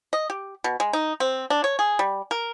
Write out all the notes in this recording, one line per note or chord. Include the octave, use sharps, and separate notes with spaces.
D#5
G4
B2
G#3
D#4
C4
D4
C#5
G#4
G3
A#4